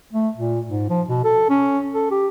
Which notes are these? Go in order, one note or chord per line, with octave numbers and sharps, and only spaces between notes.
A3
A#2
G#2
F3
B2
A4
C#4
A4
G4